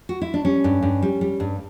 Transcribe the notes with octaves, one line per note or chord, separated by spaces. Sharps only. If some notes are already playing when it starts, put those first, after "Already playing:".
F#4
E4
D4
G3 C#4
G2
G2
G3
G3
G2